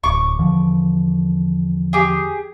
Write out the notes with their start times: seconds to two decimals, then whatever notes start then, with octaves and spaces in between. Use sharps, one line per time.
0.04 D1 C#6 D6
0.39 E2 D3 F3
1.93 G4 G#4